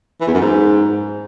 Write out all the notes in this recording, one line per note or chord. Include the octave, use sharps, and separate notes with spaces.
E3
E2
F#2
G#2